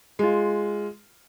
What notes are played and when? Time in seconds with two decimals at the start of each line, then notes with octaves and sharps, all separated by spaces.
0.19 G#3 F4